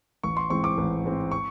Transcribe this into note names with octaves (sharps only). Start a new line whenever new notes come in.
A1 C#6
C6
G#2 E3 G#3 C4 C#6
D6
A1
G#2 E3 G#3 C4
C#6